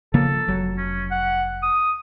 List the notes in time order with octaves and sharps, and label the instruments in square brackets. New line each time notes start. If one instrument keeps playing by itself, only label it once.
[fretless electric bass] C#3 F3 A#3 [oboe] A4
[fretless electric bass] F1 F#3
[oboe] C#4
F#5
D#6